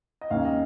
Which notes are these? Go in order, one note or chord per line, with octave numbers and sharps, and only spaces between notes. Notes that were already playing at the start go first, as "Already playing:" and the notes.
D#5
D#2 D#3 A#3 C#4 F5
D#5